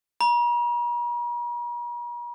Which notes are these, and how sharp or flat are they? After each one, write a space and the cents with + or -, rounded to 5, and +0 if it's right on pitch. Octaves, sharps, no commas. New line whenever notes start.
A#5 +45